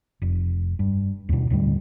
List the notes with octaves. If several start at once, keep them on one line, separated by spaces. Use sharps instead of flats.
F1
G2
D#2 B2
D#2 A2 D3 G3